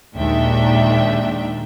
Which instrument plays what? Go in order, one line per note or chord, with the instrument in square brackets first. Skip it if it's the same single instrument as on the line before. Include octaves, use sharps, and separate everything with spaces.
[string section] A#1 D#2 G#3 D4 E5 G5